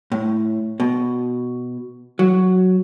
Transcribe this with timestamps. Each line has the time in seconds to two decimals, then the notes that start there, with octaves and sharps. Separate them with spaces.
0.12 A2
0.80 B2
2.19 F#3